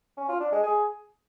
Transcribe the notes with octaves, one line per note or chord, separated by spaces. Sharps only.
C#4
F4
D4
G#3
G#4